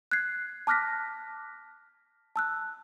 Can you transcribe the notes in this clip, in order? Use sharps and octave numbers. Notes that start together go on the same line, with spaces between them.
F#6 G#6 C7
A5 D6 F6 F#6 A#6 B6
A5 E6 F#6